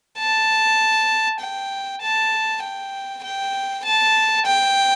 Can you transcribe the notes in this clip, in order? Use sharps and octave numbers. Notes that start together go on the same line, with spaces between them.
A5
G5
A5
G5
G5
A5
G5